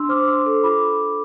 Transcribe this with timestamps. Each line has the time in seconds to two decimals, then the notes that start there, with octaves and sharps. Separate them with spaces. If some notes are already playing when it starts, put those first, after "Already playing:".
Already playing: D4 C6 E6
0.09 C5 D6 F6
0.27 D4 C6 E6
0.46 A4
0.63 F4 B5 D6